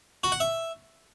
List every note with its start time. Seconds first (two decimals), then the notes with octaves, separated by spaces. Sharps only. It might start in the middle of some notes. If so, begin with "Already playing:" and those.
0.24 F#4
0.32 F#5
0.40 E5